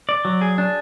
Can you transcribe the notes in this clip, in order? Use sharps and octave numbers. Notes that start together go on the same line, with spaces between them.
D5
F#3
G#4
D4